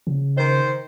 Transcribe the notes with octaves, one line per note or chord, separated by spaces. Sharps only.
C#3
D#3 C5